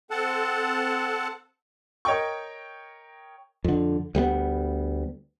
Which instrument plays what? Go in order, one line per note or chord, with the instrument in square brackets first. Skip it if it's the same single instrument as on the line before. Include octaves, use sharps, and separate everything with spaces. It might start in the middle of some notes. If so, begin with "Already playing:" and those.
[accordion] C4 A4 F#5 A5
[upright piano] A#4 C#5 D#5 G5 C#6
[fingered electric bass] F2 D3
D2 G3 A#3 B3